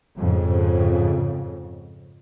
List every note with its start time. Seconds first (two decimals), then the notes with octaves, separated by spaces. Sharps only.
0.17 F2 G#2 C#3